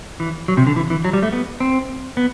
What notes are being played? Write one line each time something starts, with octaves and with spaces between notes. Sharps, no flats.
E3
F#3
C3
D3
E3
E3
F#3
G3
A3
B3
C4
B3